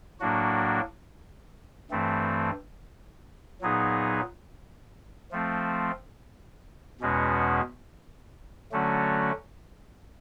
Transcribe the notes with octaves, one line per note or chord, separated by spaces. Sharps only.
A2 F#3 A#3 D4 F#4
G2 E3 A3 C4
A#2 F#3 B3 D#4 G#4
F3 A3 C4
E2 B2 G#3 C#4 F#4
D3 F#3 A3 C#4 F#4